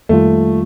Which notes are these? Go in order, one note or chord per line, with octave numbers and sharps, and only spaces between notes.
F2 D#3 G3 A3 A#3 F4